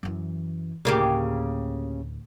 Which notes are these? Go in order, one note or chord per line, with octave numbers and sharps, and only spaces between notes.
F#2 E3
D2 A2 C#3 A#3 G4